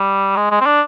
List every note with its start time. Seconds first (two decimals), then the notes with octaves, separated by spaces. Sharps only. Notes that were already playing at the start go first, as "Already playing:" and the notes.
Already playing: G3
0.37 G#3
0.51 G#3
0.60 C4
0.66 D4